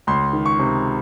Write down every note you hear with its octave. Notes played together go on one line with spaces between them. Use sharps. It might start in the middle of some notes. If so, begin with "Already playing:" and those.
C#2 C6
D#3
C#6
C3